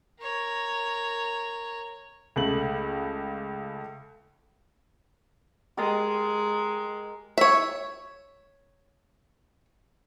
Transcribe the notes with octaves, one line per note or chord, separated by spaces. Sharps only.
A#4 C#5
C#2 A3 F#7
G#3 G4 A#4 D#5
C#5 E5